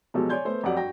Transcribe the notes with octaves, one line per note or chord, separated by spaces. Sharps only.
B2 F3 F#3 G#3 G4 A4
C#5 D5 G#5 C6 G6 G#6
A3 B3 C5
F2 F#3 G4 D5 F#5
G2 F#4 G5 A#6